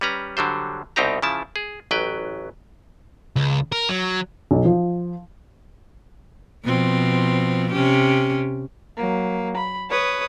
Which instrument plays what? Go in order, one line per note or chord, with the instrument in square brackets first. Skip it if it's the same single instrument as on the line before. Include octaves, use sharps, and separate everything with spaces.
[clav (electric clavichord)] G3 C#4 B4 A#5
D3 F#3 G3 C5
C2 B2 C4 D#4 G4 A#5
C#3 F3 E4 A5
G#4
A1 F#3 B4 G5
[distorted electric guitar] C#2
A#4
F#3
[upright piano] B1
F3
[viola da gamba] B2 F3 C4
C3 C#4 G4
[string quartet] F#3 A#3
B5
B4 C#5 D#6